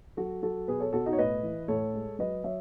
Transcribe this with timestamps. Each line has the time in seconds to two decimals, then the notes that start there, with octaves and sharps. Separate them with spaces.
0.17 F#3 F#4 A4
0.42 F#3 F#4 A4
0.68 B2 G#4 B4
0.80 A4 C#5
0.93 B2 F#4 A4
1.06 D#4 F#4
1.13 C#5
1.18 A2 B4 D#5
1.43 E3
1.68 A2 A4 C#5
1.94 G#3
2.19 F#3 B4 D#5
2.44 F#3 C#5 E5